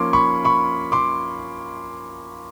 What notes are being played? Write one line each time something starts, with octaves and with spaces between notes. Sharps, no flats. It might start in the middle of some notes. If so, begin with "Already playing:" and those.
Already playing: F3 A#3 C#4 C6 D6
B5 C#6
B5 C#6
C6 D6